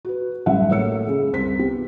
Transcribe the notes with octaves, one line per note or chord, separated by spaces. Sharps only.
F#4 B4
A1 F#3 G3 F4 E5 F#5
A2 A#3 C#5 E6 C#7
C#3 G#3
C2 C5 B6
B3 F4 G4